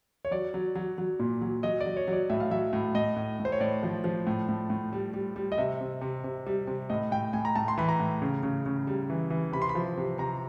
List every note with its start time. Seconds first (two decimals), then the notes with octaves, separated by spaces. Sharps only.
0.25 C#5
0.31 F#3 D5
0.54 F#3
0.75 F#3
0.98 F#3
1.19 A#2
1.41 F#3
1.63 F#3 D#5
1.80 D5
1.86 F#3
1.96 C#5
2.08 F#3
2.13 D5
2.29 A2 E5
2.40 F5
2.51 F#3 E5
2.73 A2
2.95 A2 D#5
3.16 A2
3.39 A2
3.45 C5
3.52 C#5
3.60 A2 D5
3.83 F3
4.04 F3
4.27 A2
4.49 A2
4.70 A2
4.93 G3
5.14 G3
5.36 G3
5.52 D#5
5.58 C3 E5
5.81 C3
6.01 C3
6.24 C3
6.47 G3
6.67 C3
6.90 A2 D#5
7.11 A2 G5
7.33 A2 G#5
7.45 A#5
7.56 A2 A5
7.68 C6
7.78 E3 B5
7.89 A#5
8.00 A2
8.22 C#3
8.43 C#3
8.66 C#3
8.87 G3
9.10 E3
9.30 E3
9.52 C3 B5
9.62 C6
9.69 B5
9.75 F3
9.97 C3
10.18 C3 A#5